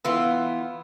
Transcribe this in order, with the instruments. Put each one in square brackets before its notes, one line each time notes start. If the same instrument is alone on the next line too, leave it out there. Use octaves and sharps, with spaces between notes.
[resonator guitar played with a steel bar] E3 B3 F4